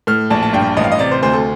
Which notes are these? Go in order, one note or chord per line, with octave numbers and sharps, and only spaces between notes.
A2 F6
A#1 A5
A5
G2 G5
A1 D#5
F5
D#5
C3 D5
C5
D2 C5
A4